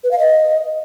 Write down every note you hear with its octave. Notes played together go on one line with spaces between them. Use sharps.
B4
F5
D#5